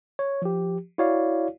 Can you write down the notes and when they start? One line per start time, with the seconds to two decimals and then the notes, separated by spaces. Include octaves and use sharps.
0.19 C#5
0.42 F3 G4
0.98 E4 F#4 C#5 D5 F5